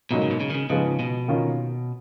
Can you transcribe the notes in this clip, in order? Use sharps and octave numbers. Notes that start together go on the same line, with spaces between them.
G#2 B2 F#3 A#3
C#3
B2
C#3
D#3
C#3
G#2 C#3 F3 B3 F4 G#4
B2
D#3 A#3 C#4 F4